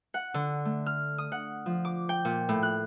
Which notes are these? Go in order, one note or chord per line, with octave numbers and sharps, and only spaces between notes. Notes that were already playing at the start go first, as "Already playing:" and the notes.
F#5
D3
A3
F6
D#6
F#5
F3
D6
G5
A#2
A2
F#6